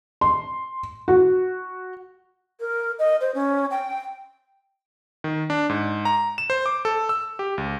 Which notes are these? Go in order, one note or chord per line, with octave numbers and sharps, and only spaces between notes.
C6
F#4
A#4
D#5
C5
C#4
G5
D#3
D4
G#2
A#5
E7
C5
D6
A4
E6
G4
C#2